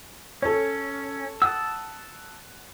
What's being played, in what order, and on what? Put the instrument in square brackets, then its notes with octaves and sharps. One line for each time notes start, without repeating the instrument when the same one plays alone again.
[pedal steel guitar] C#4 [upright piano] A4 C#5
[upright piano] F#5 [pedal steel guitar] A5 D#6 E6